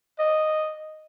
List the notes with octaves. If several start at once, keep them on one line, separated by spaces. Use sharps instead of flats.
D#5